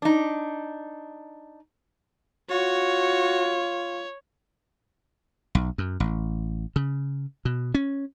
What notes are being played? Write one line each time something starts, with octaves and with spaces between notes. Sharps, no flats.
D4 D#4
F4 F#4 C#5
B1
F#2
A1
C#3
B2
C#4